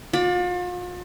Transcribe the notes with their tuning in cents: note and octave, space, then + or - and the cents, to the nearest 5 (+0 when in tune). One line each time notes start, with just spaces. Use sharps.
F4 +40 D5 +0